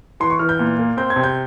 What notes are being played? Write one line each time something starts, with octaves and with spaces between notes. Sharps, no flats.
E3 C6
C#6
E3 F6
G6
A#2
A#3
C4 G6
G#6
C3
G6